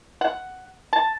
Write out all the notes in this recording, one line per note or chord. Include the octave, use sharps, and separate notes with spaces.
F#5
A5